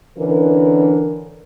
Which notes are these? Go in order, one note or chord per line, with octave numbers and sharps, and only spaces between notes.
D3 E3 C#4 D4 A#4